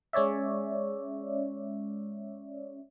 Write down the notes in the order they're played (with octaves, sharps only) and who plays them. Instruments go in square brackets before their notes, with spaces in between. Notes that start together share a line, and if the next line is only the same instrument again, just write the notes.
[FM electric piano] G#3 C#4 C#5 D5 E5